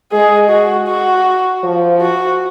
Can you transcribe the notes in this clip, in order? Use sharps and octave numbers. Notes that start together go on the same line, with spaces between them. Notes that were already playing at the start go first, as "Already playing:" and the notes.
G#3 G#4
F#4
F#4
F3
F#4